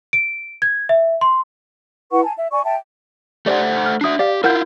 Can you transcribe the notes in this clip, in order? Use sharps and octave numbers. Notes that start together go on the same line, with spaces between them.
D7
G#6
E5
C6
E4 B4 F#5 C#6
G#5 A5
E5
D5 G#5 C#6
E5 G5 A5
A3 G4 C5 D5 F#5
F6
D4 F#4 E5 D#6 C7
G4 D5 F5
E4 F4 A#4 F#5 G6